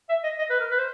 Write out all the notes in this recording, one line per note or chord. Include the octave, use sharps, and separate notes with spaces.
E5
D#5
D#5
B4
A#4
B4
C5